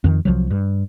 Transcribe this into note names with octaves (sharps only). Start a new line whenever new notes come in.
F2 D#3
C2 F3 F#3
G2